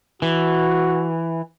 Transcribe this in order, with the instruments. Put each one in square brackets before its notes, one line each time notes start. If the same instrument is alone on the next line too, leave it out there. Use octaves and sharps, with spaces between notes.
[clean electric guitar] E3 [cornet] F#4